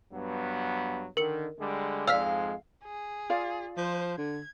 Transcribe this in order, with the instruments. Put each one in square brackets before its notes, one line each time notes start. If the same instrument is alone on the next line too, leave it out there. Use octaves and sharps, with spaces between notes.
[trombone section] G2 F#3 B3
[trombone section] D3 D#3 [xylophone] A#4 C#7
[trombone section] D3 G3 G#3
[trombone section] F2 G#2 G#3 [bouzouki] F5 [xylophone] E6 F6 B6
[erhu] G#4
[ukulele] F4 D5 F5
[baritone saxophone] F3 [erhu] C5
[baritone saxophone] D3 [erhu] G#6